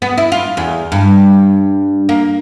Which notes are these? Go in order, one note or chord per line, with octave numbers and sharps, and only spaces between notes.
B3
E4
F4
E2
G2
A#3